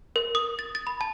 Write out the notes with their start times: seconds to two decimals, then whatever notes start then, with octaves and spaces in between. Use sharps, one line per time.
0.16 A#4
0.35 D#6
0.59 A6
0.75 A6
0.87 B5
1.01 A5